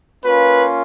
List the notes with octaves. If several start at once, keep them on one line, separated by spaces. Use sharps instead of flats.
A#3 C#4 F4 B4